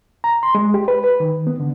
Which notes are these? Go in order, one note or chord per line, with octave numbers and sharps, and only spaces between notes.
A#5
C6
G#3
G4
B4
B4
D#3
B3
D3